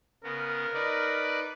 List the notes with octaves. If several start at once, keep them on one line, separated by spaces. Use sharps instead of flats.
C#3 B3 A#4
D#4 B4 D5